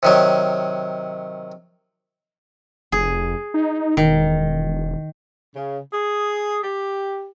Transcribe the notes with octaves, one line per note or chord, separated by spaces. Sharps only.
C3 D#3 F#3
F1 G#4
D#4
E1 D#3
C#3
G#4
G4